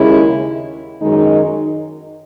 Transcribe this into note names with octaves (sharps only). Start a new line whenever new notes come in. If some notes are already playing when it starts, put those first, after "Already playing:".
Already playing: D#2 C#3 G#3 C#4 E4
F#2 D#3 G#3 D#4